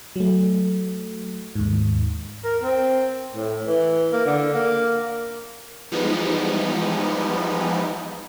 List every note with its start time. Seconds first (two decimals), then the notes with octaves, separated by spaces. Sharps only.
0.16 F#3 A3
1.55 D#2 G#2
2.44 A#4
2.63 C4
3.35 A2
3.67 E3
4.13 A#3
4.26 D3
4.54 A#3
5.91 E3 F3 G3 G#3 B3 D#4